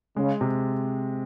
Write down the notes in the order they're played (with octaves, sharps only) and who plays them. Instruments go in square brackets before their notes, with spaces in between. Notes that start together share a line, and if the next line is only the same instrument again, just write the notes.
[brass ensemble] C#3 [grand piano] G#3
[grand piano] C3